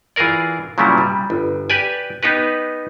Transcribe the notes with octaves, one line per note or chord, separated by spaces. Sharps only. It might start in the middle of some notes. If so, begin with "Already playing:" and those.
E3 F4 G#4 A#4 D5
A#2 C#3 F#3 G3 B3 E4
G3
G1
G4 B4 D5 G#5
B3 D#4 G4 B4